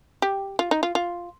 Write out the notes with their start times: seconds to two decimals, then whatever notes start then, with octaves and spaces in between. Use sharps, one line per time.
0.22 G4
0.59 F4
0.71 D#4
0.83 F4
0.95 F4